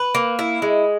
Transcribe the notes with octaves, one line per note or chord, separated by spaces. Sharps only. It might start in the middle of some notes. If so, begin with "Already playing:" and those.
Already playing: B4
A#3
E4
G#3